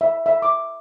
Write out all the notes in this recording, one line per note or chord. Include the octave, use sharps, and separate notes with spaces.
E5
E5
D6